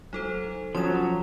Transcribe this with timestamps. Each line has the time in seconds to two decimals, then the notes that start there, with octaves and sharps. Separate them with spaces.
0.13 F#3 D#4 A4 C5
0.75 F3 F#3 C#4 C6 D#6 E7